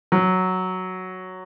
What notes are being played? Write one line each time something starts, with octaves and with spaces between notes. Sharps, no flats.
F#3